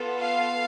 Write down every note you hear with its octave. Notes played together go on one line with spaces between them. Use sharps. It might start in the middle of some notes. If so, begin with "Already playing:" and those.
Already playing: B3 F4 A4
F5